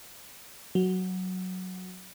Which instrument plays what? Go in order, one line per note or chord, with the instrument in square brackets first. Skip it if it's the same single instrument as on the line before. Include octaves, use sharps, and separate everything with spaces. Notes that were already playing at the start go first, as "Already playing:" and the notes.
[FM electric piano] F#3